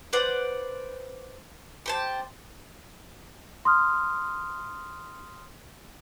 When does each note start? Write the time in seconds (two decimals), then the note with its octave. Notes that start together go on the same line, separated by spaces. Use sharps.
0.13 B4 C5 D5 F#5
1.86 G4 C5 A5
3.65 C6 D#6 F6